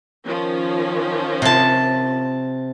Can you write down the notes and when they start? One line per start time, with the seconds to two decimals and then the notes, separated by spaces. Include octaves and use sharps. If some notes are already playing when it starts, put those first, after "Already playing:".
0.23 D#3 F3 C#4
1.42 C3 A5